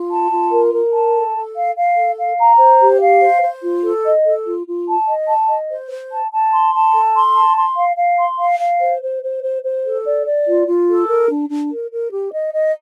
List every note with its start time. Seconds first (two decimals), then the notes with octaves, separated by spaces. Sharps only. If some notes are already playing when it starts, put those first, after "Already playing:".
Already playing: F4
0.11 A5
0.32 F4
0.52 A#4
0.73 A#4
0.93 A5
1.15 A4
1.35 A4
1.56 F5
1.76 F5
1.97 A4
2.18 F5
2.39 A#5
2.59 C5
2.80 G4
3.01 F5
3.22 C5
3.43 C5
3.62 F4
3.84 A4
4.04 D#5
4.26 A4
4.46 F4
4.67 F4
4.88 A5
5.07 D#5
5.28 A5
5.50 D#5
5.70 C5
5.90 C5
6.12 A5
6.33 A5
6.53 C6
6.73 A5
6.94 A4
7.15 C6
7.35 A5
7.57 C6
7.77 F5
7.97 F5
8.19 C6
8.39 F5
8.60 F5
8.80 C5
9.02 C5
9.23 C5
9.44 C5
9.63 C5
9.85 A4
10.05 D5
10.26 D5
10.47 F4
10.67 F4
10.88 A4
11.08 A#4
11.30 D4
11.50 D4
11.71 A#4
11.91 A#4
12.12 G4
12.32 D#5
12.54 D#5